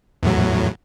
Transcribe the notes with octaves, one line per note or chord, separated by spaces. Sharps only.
E2 A2 F#3